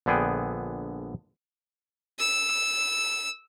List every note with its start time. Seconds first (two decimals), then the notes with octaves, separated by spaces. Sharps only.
0.06 A#1 D3 B3 G#4 G5
2.19 E6